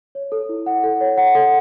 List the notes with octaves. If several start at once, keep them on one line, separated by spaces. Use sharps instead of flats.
C#5
A4
E4
F#5
A4
C#5
F#5
A4